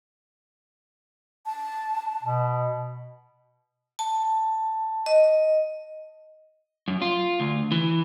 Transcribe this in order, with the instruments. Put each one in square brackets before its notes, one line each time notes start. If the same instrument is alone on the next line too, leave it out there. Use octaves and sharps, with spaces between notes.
[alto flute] A5
[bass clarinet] B2
[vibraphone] A5
D#5
[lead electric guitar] F#2
F4
D2
E3